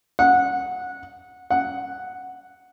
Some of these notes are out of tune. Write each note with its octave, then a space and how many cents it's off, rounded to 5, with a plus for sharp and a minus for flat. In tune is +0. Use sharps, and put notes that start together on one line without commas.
F#5 -15
F#5 +0